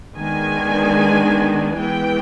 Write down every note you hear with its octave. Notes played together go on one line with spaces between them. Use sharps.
D#3 G#3 B3 D4 G#5
E3 G#3 B3 G5